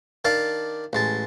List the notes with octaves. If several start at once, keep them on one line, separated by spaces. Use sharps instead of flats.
D#3 D4 F5 A5 D6
A1 G#3 A5